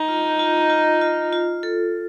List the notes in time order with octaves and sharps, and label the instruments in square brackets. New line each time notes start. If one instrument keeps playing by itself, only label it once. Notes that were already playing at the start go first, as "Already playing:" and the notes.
Already playing: [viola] D#4
[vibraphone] F4
F4
F4
F4
F4
A4